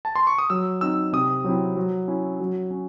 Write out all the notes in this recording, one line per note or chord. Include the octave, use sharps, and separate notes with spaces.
A5
C6
C#6
D#6
F#3 E6
C4 D#4 E6
C3 D#6
F#3 C4 E4
F#3
C#4 E4
F#3
C#4